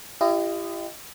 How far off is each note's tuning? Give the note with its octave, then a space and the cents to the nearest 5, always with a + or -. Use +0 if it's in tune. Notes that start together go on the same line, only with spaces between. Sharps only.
E4 +40 G4 +0 D#5 -10